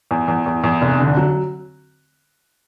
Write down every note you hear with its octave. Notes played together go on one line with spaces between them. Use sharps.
E2
E2
E2
E2
F1
D3
F#3